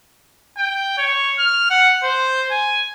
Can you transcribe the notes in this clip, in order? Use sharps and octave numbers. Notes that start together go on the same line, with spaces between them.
G5
C#5
F6
F#5
C5
G#5